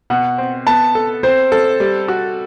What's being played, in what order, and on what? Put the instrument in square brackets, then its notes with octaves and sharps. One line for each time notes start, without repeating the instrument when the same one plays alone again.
[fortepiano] B2 [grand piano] F#5
[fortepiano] C4
[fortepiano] B3 [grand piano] A5
[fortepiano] A4
[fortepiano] C4 [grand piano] C5
[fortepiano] A4
G3
F#4